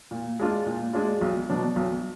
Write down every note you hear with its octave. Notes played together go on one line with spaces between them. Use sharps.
A#2
G#3 D4 F4
A#2
G#3 D4 F4
B1
B2 F#3 D4
B1